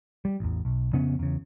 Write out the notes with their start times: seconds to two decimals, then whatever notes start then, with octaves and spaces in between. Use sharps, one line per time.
0.25 G3
0.40 A1 E2
0.65 B1
0.93 F2 C#3 B3 C#4
1.19 E2 C#3